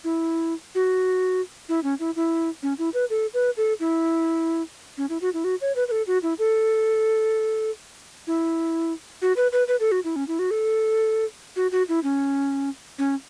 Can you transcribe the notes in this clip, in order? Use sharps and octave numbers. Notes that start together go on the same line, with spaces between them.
E4
F#4
E4
C#4
E4
E4
C#4
E4
B4
A4
B4
A4
E4
C#4
E4
F#4
E4
F#4
C#5
B4
B4
A4
F#4
E4
A4
E4
F#4
B4
B4
B4
A4
F#4
E4
C#4
E4
F#4
A4
F#4
F#4
E4
C#4
C#4